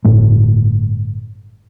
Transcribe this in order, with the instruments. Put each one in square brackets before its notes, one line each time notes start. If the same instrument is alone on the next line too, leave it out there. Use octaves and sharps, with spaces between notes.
[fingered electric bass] G1 A2 A3